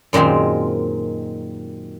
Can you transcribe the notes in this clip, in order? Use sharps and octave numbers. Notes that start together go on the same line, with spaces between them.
F#2 A#2 D#3 G#3 C4